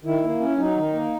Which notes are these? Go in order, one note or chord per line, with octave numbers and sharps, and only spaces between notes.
D#3 E4
A#3
C#4
F#3 D#4
D#3
A#3